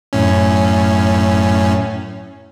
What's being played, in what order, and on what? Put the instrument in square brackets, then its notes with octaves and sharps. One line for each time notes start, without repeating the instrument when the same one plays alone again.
[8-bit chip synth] F#2 A2 C#4